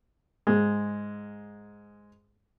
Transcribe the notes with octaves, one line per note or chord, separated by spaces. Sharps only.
G#2 G#3